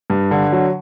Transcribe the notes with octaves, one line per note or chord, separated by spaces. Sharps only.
G2
D3
F#3